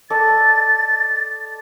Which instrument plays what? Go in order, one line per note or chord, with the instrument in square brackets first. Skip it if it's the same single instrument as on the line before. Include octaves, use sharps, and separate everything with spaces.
[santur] A4 D5 D#5 [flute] A6